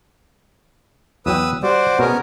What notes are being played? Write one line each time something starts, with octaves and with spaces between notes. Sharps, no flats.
E2 F#3 B4 G5 D#6 E6
G3 F#4 C5 D5
B2 B3 C#4 G#4 A#4